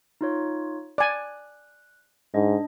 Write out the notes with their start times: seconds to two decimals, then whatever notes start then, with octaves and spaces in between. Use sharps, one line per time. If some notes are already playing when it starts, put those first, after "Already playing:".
0.21 D#4 F4 C#5
0.98 D5 G#5 F#6
2.34 G#2 D4 D#5